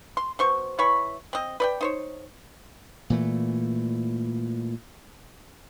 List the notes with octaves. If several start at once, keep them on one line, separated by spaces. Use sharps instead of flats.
C6
B2 C5 C#6
E3 C#5 B5 C#6
C4 D#5
B4 D5 G5
D#4 C5 C#5
A#2 E3 A3